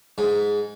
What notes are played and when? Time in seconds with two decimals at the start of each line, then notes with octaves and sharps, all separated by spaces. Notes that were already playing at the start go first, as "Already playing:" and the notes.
0.18 G#2